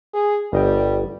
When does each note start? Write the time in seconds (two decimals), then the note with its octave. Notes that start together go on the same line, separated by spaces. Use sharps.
0.14 G#4
0.53 G1 G3 D#5 G5